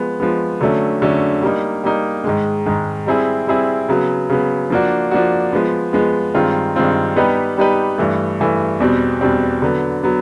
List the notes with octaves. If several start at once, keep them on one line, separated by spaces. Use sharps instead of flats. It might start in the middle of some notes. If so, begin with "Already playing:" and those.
Already playing: F3 G#3 B3
F3 G#3 B3
D3 F#3 A3 C#4
D3 F#3 A3 C#4
G3 A#3 D#4
G3 A#3 D#4
G#2 D#3 G#3
G#2 D#3 G#3
G3 C4 E4 G#4
G3 C4 E4 G#4
C#3 F#3 B3
C#3 F#3 B3
F3 A#3 D4 F#4
F3 A#3 D4 F#4
F3 G#3 B3
F3 G#3 B3
G2 D#3 G#3 C4 F4
G2 D#3 G#3 C4 F4
G3 B3 D#4 G4 B4
G3 B3 D#4 G4 B4
G2 E3 A3
G2 E3 A3
E2 B2 G3 C4
E2 B2 G3 C4
D3 F#3 B3
F#3 B3